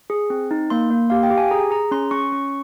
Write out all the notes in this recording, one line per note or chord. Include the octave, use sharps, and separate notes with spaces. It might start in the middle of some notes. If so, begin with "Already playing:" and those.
G#4
C4
D#4
A#3 C6
A#3
G4 F5
G5
G4
G#5
G#4 A#5
G#4 A#5
C#4 C6
C#4 C#6
C#4